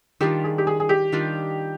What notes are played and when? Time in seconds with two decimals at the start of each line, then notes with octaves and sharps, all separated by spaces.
0.21 D#3 G3 D4 F4 G4
0.44 G#4
0.58 G4
0.67 G#4
0.80 G#4
0.89 G4
1.12 D#3 G3 D4 F4